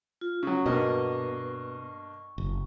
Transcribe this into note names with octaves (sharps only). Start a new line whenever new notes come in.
F4
C#3 F#3 C#6
G2 B2 A#3 D#5
F#1